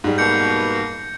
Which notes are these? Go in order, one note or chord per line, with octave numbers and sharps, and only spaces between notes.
G#2 G3
B2 A#3 G6 C#7